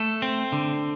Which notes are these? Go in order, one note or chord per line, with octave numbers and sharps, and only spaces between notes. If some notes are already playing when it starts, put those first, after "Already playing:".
Already playing: A3 A4
C4
D3